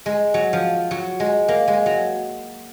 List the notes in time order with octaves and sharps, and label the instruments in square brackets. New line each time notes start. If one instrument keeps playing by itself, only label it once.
[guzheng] G#3
F#3
F3
F#3
G#3
A#3
G#3
F#3